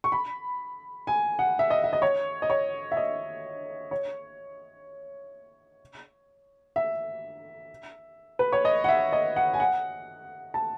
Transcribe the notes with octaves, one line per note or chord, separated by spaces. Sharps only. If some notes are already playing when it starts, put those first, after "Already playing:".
C#6
B5
G#5
F#5
E5
D#5
E5
D#5
C#5
D#5
C#5
E5
D#5
C#5
E5
B4
C#5
D#5
F#5
E5
D#5
F#5
G#5
F#5
A5